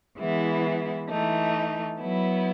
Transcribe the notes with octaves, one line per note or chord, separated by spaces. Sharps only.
E3 G#3 B3 E4
E3 A3 D#4
F#3 B3 E4